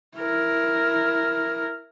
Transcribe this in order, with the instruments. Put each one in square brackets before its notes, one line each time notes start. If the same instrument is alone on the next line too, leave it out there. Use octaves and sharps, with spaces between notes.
[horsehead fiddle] E4 A#4